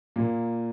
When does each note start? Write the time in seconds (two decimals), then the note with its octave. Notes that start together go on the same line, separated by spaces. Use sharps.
0.16 A#2 A#3